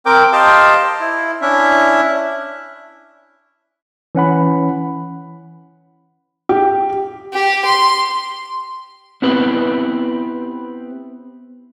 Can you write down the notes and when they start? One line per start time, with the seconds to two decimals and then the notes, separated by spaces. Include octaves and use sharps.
0.06 C4 A#4 G5 D6
0.33 G4 C5 D#5 F5 G5 A5
1.00 E4
1.42 C#4 D4 E4 E5
4.15 E3 C#4 F#5 B5
6.49 G4
7.34 G4
7.65 C6
9.22 B3 C4 E4 G4 B4